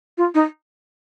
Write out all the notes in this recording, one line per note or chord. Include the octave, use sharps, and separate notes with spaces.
F4
D#4